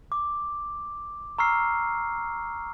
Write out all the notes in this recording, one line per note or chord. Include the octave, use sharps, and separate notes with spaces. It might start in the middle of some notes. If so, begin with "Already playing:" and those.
D6
A#5 C#6 E6 F6 C7